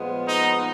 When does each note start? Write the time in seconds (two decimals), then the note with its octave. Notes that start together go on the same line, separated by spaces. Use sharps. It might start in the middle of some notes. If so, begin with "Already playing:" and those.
Already playing: A#2 F3 G#3 B3
0.26 D#4